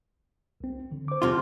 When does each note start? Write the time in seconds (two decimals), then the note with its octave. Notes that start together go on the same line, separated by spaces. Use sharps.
0.60 C2 C4
0.91 D3 E3
1.08 C5 D6
1.22 F2 C3 F4